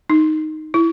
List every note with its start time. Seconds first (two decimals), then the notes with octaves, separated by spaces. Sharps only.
0.10 D#4
0.74 E4